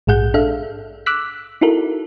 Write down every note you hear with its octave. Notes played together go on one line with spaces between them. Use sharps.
A#1 G#2 G#4 F#5 G6
D4 A4 E5 F5
D6 E6 F#6 B6
D#4 E4 F#4 A4 A#4